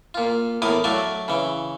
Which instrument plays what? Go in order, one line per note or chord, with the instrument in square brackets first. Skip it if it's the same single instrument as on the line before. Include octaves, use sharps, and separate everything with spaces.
[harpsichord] A#2 F4
E2 A2 A#4 D6 D#6
F#3 A3 F#4 D5 F5
C#3 E3